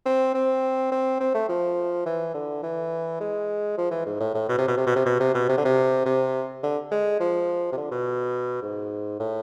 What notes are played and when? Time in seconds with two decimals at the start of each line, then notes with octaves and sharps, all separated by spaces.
0.06 C4
0.34 C4
0.92 C4
1.20 C4
1.34 A3
1.49 F3
2.06 E3
2.34 D3
2.63 E3
3.20 G#3
3.78 F3
3.91 E3
4.06 G#2
4.20 A2
4.34 A2
4.49 B2
4.58 C3
4.68 B2
4.77 C3
4.87 B2
4.96 C3
5.06 B2
5.20 C3
5.34 B2
5.49 C3
5.58 D3
5.65 C3
6.05 C3
6.63 D3
6.91 G#3
7.20 F3
7.72 C3
7.77 D3
7.91 B2
8.62 G#2
9.20 A2